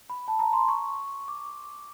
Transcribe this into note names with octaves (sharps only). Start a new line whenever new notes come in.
B5
A5
A#5
C6
C#6
D6